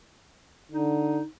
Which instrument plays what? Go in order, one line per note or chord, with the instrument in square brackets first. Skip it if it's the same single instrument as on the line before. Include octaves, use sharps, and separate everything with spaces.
[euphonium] D3 [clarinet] D#4